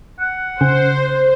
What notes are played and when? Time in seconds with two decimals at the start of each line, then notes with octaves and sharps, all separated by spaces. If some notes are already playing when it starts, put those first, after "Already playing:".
0.20 F#5
0.61 C#3 C5